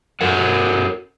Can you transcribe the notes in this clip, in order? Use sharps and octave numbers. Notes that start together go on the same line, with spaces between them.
F#4 A4 A#4 F#5